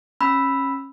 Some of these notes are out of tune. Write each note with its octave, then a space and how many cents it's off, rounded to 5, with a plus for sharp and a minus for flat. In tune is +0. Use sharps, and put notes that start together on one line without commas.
C#4 -25 B5 +0 E6 +0